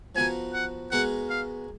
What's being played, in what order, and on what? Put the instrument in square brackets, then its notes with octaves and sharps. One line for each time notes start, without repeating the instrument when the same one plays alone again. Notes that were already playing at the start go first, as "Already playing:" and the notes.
[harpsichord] F3 B3 F#4 A#4 [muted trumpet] G#5
[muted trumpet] F#5
[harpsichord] G#3 B3 F#4 A#4 [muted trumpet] F#5
[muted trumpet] F5